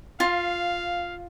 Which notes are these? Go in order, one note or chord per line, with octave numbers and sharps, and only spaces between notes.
F4 F5